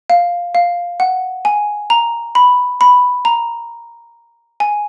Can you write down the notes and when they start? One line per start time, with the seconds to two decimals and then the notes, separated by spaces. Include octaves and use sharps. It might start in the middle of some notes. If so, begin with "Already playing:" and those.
0.10 F5
0.55 F5
1.00 F#5
1.45 G#5
1.90 A#5
2.35 B5
2.81 B5
3.25 A#5
4.60 G#5